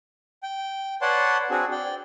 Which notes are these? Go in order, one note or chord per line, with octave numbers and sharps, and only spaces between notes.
G5
B4 C#5 D5 F#5 A5 C6
C4 D4 F#4 G#4
D5 G5